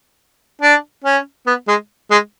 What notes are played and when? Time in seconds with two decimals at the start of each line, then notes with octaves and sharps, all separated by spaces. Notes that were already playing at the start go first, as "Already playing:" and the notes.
0.61 D4
1.04 C#4
1.46 B3
1.68 G#3
2.11 G#3